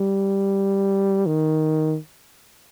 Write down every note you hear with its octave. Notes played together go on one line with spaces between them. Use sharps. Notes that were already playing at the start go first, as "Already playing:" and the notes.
Already playing: G3
D#3